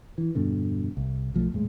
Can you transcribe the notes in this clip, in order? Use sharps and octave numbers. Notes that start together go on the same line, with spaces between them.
E3
E1 G2 B2 D3
C2
B1 F3 A3
D#1 A2 G#3